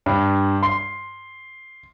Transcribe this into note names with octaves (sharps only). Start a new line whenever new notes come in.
G2
C6